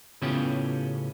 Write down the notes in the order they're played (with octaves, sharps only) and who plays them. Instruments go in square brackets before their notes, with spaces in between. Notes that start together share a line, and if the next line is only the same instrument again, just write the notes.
[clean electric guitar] A2 C#3 B3 C#4 F4 G4